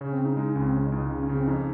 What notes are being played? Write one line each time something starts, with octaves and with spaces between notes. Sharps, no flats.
C#3 C#4
C4
C#3
D#4
G#3 D#4
C#4
C#2
C4
C#2 C#4
D#4
C#2
D#4
C#3
C#4
C#3
C4
F2 D#4